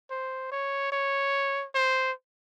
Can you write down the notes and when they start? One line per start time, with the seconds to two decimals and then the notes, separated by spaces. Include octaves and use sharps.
0.11 C5
0.52 C#5
0.92 C#5
1.75 C5